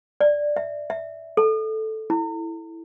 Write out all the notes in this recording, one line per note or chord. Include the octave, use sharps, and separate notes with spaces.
D5
E5
E5
A4
E4